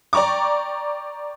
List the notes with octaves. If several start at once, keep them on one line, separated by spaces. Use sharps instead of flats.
D5 G5 A#5 C#6 D6